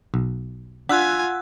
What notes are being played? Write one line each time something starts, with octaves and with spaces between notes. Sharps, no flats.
B1
D4 F4 F#5 G#5 E6 F#6